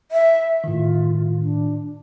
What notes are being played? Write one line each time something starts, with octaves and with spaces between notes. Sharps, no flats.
E5
A2 D#3 F4
D4